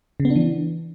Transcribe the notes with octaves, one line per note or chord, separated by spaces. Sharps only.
C#3
B3
D4
E3